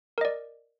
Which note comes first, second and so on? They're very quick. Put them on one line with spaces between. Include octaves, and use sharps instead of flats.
A#4 D#5 D5